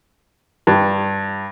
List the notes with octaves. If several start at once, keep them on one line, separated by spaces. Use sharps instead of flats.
G2